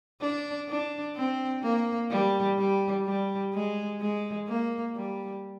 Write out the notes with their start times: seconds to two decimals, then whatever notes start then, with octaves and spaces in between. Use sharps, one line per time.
0.21 D4
0.69 D4
1.15 C4
1.63 A#3
2.10 G3
2.57 G3
3.05 G3
3.53 G#3
4.01 G#3
4.48 A#3
4.95 G3